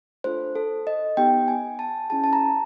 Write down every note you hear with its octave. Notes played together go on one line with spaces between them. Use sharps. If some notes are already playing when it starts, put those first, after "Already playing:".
A3 D4 F4 A4 C5
A4
D#5
B3 D#4 G4 G5
G#5
A5
C#4 E4 G#4 A5
A5
A#5